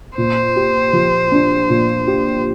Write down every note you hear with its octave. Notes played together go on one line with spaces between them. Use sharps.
A#2 C5
G4
F3
D4
A#2
G4